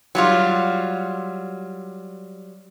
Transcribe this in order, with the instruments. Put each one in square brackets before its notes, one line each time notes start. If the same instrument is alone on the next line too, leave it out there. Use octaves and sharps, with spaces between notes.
[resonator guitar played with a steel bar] F#3 G3 F4